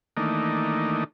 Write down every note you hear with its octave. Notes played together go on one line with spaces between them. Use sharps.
D#3 E3 A3 A#3 D4 D#4